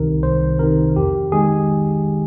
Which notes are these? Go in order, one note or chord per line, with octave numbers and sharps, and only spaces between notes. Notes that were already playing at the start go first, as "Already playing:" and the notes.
Already playing: C2 C3 D#3 A#4
C2 C5
C3 D#3 A#4
F2 G4
D#3 G#3 G#4